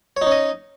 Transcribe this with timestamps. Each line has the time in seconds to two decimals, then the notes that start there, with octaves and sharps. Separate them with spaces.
0.17 C#5
0.22 D#4
0.27 C#4
0.32 D#5